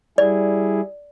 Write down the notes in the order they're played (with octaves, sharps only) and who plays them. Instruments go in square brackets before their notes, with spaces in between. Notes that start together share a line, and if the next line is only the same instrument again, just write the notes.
[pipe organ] G3 E4 G#4 [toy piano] D5